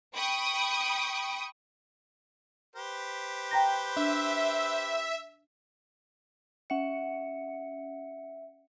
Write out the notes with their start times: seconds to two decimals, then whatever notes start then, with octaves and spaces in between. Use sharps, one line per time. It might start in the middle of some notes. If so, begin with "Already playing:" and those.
0.15 G5 B5 C#6 D#6
2.76 G4 B4 C5
3.51 G5 A#5 A#6
3.97 D4 E5
6.70 C#4 E5 F#5 C#7